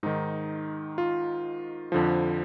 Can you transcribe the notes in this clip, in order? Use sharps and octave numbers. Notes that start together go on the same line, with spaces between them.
G#2 D#3 D#4
F4
F2 D3 F3